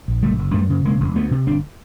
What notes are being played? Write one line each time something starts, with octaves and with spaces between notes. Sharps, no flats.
A#1
F#1 G3 A3
F#1
F#2 G3 A3
C#3
E1 G#3 A#3
E1
D2 A3 B3
C3
G1 C4 D4